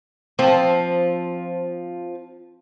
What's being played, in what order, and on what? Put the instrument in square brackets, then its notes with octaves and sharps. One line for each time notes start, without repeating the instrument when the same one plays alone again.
[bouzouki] F3 [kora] C4